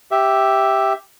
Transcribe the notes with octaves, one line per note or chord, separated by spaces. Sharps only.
G4 E5